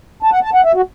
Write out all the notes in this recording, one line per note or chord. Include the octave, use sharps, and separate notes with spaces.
A5
F#5
A5
F#5
E5
F#4